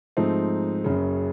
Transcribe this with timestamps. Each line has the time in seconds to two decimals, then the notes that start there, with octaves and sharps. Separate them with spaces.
0.17 G#2 F3 A3 C4 D#4
0.84 F#1 F#2 C#3